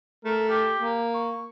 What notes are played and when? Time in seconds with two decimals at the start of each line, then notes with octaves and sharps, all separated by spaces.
0.25 A3 A#4
0.49 G4
0.78 A#3
1.15 C#6